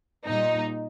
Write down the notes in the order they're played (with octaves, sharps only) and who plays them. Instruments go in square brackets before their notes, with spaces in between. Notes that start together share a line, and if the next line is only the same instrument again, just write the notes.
[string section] A#2 G3 D#4